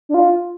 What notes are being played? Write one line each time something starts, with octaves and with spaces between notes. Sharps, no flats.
D4
F4